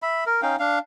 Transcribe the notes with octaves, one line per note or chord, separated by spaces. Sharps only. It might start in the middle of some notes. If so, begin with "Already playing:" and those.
E5 B5
A#4
C#4 D#4 F5 G5
D4 F5